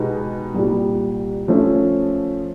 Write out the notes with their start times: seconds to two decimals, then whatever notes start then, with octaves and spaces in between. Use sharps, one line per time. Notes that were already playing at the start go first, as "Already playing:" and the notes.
Already playing: B2 G#3 B3 D#4 G4
0.54 C2 A#2 G3
1.48 F3 A3 C#4